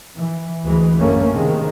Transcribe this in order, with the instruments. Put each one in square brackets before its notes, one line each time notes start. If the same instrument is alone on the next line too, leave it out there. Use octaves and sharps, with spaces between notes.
[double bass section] E3
D2 E3 G#3
A1 F#2 A3 A#3 C#4
C3 D#3 G#3